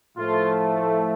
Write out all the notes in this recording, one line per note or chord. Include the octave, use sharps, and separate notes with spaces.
A2 F3 A3 F4